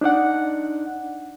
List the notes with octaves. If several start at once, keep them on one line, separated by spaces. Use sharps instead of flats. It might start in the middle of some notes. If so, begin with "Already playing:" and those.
D4 D#4 D5 F#5